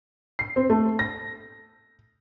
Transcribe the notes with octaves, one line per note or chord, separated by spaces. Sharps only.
C7
C4
A3
A#6